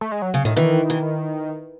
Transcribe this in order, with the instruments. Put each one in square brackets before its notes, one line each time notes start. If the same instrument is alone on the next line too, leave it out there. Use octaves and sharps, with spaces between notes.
[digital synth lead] A3
G#3
F#3
[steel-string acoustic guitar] C#3
[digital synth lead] A2 [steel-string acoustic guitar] D#3
[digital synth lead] D#3 [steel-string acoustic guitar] E3
[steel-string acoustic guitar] E3